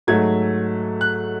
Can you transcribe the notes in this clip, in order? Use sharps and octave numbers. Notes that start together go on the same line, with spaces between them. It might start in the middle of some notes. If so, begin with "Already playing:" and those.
G#2 F#3 A3 G#6
F#6